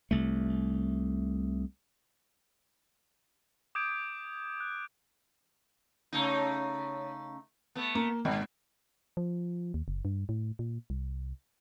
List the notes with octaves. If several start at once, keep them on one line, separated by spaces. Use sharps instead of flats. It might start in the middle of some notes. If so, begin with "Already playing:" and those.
C2 A3
D6 D#6 G6 G#6 D7
F#6
C#3 A3 D#4
A3 B3
A#3
G#1 A#2
F3
D#2
F#1
G2
A2
A#2
C2